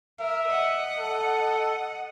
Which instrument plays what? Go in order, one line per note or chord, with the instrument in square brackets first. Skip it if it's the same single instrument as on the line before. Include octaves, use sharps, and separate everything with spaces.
[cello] A#4 [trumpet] E5
[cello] D#5 F#5
[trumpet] A4